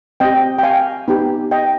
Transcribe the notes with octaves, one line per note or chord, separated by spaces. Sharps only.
C4 G4 D#5 G5
G5
F5 G#5
B3 D#4 G4
D#5 G5